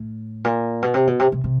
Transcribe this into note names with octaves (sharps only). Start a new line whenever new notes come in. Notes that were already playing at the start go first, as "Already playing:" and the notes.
Already playing: A2
A#2
B2
C3
B2
C3
C3
C3